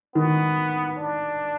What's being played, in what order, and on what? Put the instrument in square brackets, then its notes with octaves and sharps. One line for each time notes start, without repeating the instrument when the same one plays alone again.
[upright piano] D#3 [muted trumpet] B3
[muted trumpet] D4